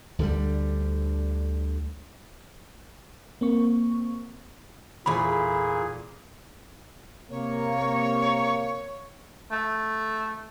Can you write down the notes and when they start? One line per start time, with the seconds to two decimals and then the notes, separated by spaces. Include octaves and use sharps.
0.19 D2 D3 D#3 G3
3.41 A#3 C4 C#6
5.06 E2 A#2 A3 F4 G#4 B5
7.30 C3 A#3 C#5
9.52 A3